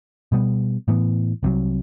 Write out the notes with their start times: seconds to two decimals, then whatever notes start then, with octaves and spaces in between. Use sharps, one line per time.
0.32 B2 G3 B3
0.88 A2 E3 B3
1.43 C2 C3 D#3 F#3